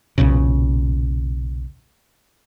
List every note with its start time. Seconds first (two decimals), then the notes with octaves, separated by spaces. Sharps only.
0.18 B1 E2 A#2 C#3